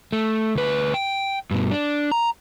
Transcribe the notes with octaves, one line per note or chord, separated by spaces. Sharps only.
A3
D2 B4
G5
G2 B2
D4
A#5